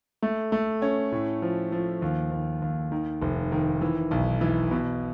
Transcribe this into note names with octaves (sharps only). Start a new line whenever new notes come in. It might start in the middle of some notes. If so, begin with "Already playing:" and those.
A3
A3
C#4
A2
F3
F3
D#2
D#2
D#2
D#3
F1
D#3
E3
B1
E3
B2